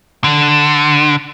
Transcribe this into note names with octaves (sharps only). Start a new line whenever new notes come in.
D3